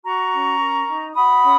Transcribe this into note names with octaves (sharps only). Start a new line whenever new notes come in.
F#4 A#5 C#6
C#4
A#4
D#4
F#4 B5 D#6
C#4